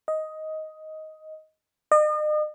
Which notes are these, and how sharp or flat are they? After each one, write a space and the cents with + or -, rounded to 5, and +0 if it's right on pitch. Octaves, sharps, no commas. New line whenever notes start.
D#5 +10
D#5 -40